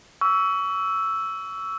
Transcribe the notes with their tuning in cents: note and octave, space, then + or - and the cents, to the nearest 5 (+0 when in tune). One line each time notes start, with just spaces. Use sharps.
C#6 +30 E6 +0